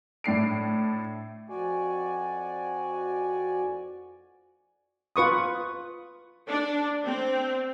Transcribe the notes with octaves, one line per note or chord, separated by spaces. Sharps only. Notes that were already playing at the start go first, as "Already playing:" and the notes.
A2 D4 C7 D7
F2 F#4 D5 G#5
F4 B4 C#6 D#6
D4
C4